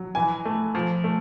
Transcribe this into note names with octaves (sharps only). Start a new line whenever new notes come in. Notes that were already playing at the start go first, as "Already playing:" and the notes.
Already playing: F#3
E3 G#5
A3
F3
A3